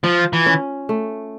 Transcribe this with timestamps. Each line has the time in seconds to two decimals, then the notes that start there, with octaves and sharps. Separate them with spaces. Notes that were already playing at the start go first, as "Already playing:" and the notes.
0.04 F3 F4
0.33 E3
0.46 C#4
0.89 A3